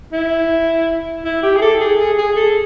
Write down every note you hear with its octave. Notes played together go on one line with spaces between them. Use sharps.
E4
E4
G4
G#4
A4
G#4
G#4
G#4
A4